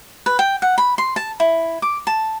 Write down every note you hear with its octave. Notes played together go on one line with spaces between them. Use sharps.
B4
G5
F#5
B5
C6
A5
E4
D6
A5